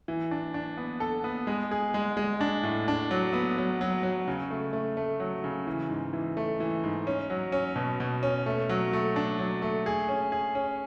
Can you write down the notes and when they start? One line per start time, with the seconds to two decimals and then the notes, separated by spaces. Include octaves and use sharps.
0.08 E3
0.31 D4
0.54 D4
0.77 B3
1.00 A4
1.24 B3
1.47 G#3
1.71 G#4
1.94 G#3
2.17 G#3
2.41 D4
2.63 A2
2.88 D4
3.11 F#3
3.33 B3
3.58 F#3
3.81 F#3
4.03 F#3
4.28 C#3
4.51 A3
4.73 A3
4.97 A3
5.20 F#3
5.44 C#3
5.67 E3
5.90 G#2
6.13 E3
6.37 A3
6.60 E3
6.84 G#2
7.07 C#4
7.30 F#3
7.52 C#4
7.76 B2
8.00 B2
8.23 C#4
8.46 A3
8.69 F#3
8.93 A3
9.16 D4
9.39 F#3
9.62 A3
9.86 G#4
10.09 C#4
10.32 G#4
10.55 C#4